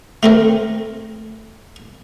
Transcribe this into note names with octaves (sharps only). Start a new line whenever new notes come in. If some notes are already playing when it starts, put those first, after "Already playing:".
A3 C4 A#4